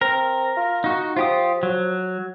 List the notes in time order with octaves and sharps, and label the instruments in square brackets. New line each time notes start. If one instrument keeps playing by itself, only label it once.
[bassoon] C4 [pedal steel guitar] A#4
[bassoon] F4
[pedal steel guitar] D#4 F#4
[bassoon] F3 [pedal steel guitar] F4 G4 D#6
[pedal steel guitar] F#3